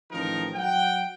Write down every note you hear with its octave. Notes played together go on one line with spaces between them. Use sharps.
A1 D#3 F3 D#4 A#4
F#3 F#5 G5